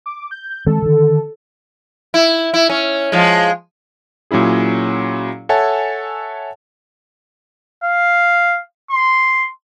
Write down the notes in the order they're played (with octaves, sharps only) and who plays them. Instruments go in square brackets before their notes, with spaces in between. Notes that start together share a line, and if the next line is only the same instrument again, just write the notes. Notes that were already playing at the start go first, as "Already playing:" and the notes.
[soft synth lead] D6
G6
[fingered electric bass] D#3 G#3 C4 [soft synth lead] A4
[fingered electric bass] D3 D#3
[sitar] E4
E4
C#4
F3 G#3
[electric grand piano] A#2 F#3 C#4 E4 G#4
A4 C#5 E5 F#5 G#5 A5
[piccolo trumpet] F5
C6